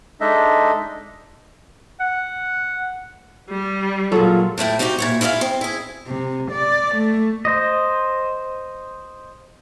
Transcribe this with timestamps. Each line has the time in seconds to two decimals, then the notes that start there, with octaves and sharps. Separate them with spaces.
0.21 G#3 D4 D#4 A4 D#5 E5
2.00 F#5
3.50 G3
4.12 A#2 F#3 F4 G#4 A4
4.58 A2 A3 E4 G5
4.79 G3 D#4 F#4 G4 C5
4.99 A#2 E4 C#5
5.21 E4 F4 G#4 E5 F5
5.41 C4
5.61 E4 G#4
6.07 C3
6.52 D5
6.95 A3
7.45 C5 D#5